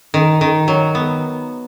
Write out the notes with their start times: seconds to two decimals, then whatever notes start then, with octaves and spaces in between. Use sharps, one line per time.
0.14 D#3
0.41 D#3
0.68 F#3
0.95 B3